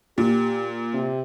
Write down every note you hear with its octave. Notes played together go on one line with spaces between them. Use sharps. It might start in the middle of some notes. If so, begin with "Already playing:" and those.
A#2 G4
C3